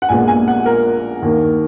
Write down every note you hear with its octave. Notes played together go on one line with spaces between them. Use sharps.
F#5
A#1 A#2 G#3 B3 G#5
G#5
F#5
A#4
D#2 D#3 A#3